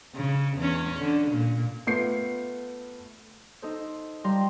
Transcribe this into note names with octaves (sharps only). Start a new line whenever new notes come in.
C#3
E2 C#4
D3
A#2
A3 B3 F4 G6 C7 C#7
D#4 A4 C5
G3 F4 A#5 C6